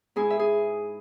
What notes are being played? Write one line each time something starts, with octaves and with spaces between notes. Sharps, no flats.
G#2 E4 G#4
E5
G#4